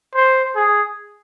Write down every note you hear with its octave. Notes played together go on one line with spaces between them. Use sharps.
C5
G#4